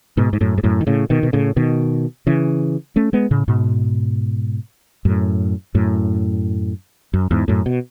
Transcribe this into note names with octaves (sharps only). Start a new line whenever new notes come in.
G#2 B2
G#2
F#2 A2
G#2
F#2 A2
D#3
A2 C#3
B2 D#3
B2
A2 C#3
B2 D#3
C#3 E3
A3 C#4
G#3 B3
A2 C#3
G#2 B2
F#2 A2
F#2 A2
F#2
E2 G#2
F#2 A2
B2